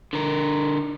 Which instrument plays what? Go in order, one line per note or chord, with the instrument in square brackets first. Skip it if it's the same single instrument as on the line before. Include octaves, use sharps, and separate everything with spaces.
[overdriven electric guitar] D3 A#4